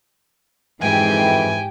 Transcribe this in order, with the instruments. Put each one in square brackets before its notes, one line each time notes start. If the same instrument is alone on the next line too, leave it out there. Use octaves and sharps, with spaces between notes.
[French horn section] F2 E3 [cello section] G#2 [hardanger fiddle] G4 G5 [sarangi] G#5